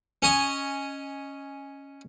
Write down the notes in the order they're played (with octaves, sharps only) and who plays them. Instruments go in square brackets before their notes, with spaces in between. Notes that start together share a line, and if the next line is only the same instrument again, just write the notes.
[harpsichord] C#4 D#5 G#5